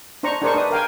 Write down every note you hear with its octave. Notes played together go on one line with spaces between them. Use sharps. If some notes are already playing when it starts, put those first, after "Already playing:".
D4 D#4 C5 A#5 C#6
D4 D#4 G#4 A#4 C5 C#6
D4 D#4 B4 D5 D#6
A#4 F5 G5 G#5